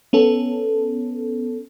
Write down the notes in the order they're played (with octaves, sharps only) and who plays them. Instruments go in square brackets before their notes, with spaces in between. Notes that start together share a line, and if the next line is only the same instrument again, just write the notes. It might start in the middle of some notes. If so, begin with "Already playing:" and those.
[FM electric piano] B3 C#4 A4